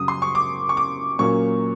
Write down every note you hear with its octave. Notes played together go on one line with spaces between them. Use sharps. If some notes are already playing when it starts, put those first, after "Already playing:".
Already playing: F#2 C#3 F#3 D#6
C6
C#6
D6
C#6
D6
A#2 F#3 A#3 C#4 C#6